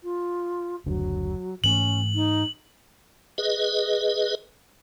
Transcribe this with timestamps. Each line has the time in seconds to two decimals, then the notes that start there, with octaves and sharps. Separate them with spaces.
0.04 F4
0.86 F#1 D2 F#3 D4
1.64 G#2 E3 A3 C#4 F#7
2.15 D#4
3.38 G#4 B4 D#5